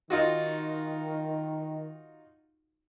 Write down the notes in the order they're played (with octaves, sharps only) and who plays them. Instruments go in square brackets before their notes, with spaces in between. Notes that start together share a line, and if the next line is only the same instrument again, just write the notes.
[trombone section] D#3 [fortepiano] D#4 F4 F#4